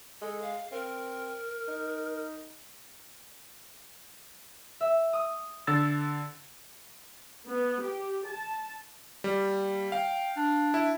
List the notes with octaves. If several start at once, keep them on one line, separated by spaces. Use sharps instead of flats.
G#3 A4
F5
C4 A#4
D#4
E5
D#6
D3 E6 A6
B3
G4
A5
G3 A#3
F5 G5
D4
E4